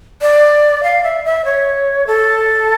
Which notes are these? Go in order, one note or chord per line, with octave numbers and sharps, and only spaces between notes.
D5
F5
E5
E5
C#5
A4